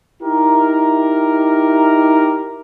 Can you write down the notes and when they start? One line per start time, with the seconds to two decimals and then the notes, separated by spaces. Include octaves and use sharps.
0.23 D#4 E4 G4 A#4